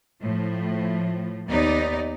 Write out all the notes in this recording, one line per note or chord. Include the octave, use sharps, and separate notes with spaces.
A2 F3
D#2 B3 D#4 D5